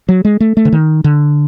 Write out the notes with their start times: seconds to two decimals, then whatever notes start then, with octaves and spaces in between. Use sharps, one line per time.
0.09 F#3
0.25 G#3
0.40 A3
0.57 A3
0.65 D3
0.72 D#3
1.04 D3